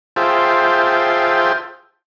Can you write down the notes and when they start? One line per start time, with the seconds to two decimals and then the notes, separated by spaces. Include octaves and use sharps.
0.16 F4 G#4 C5 E5 G5 A5